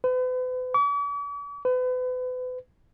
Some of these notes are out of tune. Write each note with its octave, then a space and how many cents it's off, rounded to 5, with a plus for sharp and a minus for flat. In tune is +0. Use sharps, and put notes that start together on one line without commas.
B4 +40
D6 -45
B4 +35